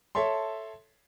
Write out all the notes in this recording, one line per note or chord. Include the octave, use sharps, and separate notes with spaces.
A4 C#5 E5 A5 C6